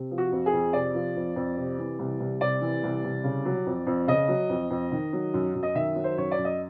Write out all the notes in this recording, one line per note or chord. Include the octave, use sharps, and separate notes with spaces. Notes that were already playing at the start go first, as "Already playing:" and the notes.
Already playing: C3
F3
F#4
F2
G#4
F2
C3 D5
F3
F2
F2
C3
E3
C2
C2
C3 D5
E3
C2
C2
C#3
F#3
F2
F2
C#3 D#5
F#3
F2
F2
D#3
F#3
F#2
F#2
D#5
D#3 E5
F#3
C5
F#2 C#5
D5
F#2
D#5